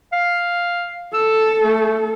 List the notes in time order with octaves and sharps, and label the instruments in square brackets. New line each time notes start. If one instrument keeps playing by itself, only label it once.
[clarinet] F5
[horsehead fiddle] A4 [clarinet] E6
[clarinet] A3